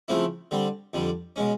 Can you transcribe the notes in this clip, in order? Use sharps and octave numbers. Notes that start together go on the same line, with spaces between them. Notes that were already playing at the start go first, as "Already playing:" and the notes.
C#3 F3 A3 C4 E4
D3 G3 C4
F2 D3 G3
B2 G#3 C#4